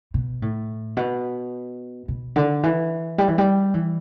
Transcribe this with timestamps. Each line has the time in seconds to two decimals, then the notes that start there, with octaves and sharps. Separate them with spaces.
0.14 B2
0.42 A2
0.97 B2
2.08 B2
2.36 D3
2.63 E3
3.18 G3
3.28 E3
3.38 G3
3.74 E3